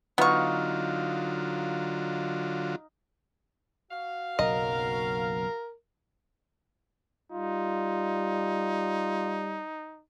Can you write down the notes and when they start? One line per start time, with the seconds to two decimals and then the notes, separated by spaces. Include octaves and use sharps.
0.18 D3 F#3 B3 D#4 F4 F5 C#6
3.91 F#4 F5
4.39 F#1 B1 F#3 A#4 D#5
7.32 G3 D#4 F4